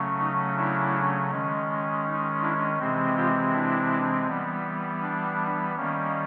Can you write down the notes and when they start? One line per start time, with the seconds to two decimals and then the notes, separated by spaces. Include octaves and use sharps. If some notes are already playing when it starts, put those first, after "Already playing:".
Already playing: C#3 F#3 A3 C#4
0.19 D#4
0.56 D4 E4
1.30 D#3 G#3 C#4
2.05 D#4
2.42 D4 E4
2.79 C3 E3 G#3 C4
3.16 F4 G4
3.53 D4 E4
4.27 E3 G3 B3
5.02 D4
5.76 D#3 G3 A#3 C#4